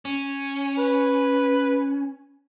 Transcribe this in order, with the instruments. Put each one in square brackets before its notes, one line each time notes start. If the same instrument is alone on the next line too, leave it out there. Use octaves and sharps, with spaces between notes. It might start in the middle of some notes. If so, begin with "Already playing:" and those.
[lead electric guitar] C#4
[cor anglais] B4